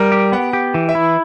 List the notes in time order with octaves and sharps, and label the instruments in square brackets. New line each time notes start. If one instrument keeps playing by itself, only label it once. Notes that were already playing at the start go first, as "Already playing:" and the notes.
Already playing: [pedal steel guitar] G3 [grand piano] A#4
[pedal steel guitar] G4
[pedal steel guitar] B3 [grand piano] F#5
[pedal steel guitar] G4
E3
[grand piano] E5
[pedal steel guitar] E4